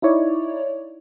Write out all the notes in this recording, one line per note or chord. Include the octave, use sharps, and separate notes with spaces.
D#4 E4 C#5 D5